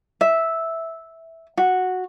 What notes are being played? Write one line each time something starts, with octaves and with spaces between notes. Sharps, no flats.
E5
F#4